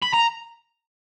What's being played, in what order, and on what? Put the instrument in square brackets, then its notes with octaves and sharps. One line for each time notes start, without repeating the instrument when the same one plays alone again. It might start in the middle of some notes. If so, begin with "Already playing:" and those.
[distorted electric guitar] B5
A#5